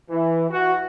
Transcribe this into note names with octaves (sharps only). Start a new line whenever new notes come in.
E3
F#4